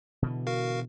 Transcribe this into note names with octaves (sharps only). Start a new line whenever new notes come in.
B2 D3 E3
F#4 A#4 F5